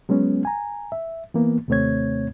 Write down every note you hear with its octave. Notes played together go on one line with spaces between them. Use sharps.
F#3 G#3 B3 C#4
G#5 A#5
E5
E3 A#3 B3
D#2 C3 A3 C4 C#5 G#6